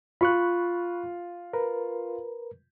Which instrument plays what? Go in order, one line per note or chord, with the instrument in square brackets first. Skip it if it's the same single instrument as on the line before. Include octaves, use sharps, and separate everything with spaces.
[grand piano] F4 [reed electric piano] B5 C#6 F#6
[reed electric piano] A#4 B4